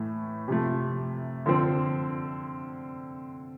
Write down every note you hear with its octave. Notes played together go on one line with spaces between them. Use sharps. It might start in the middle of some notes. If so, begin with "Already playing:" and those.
Already playing: A2 E3 A3
C3 F3 A3
D3 F3 C4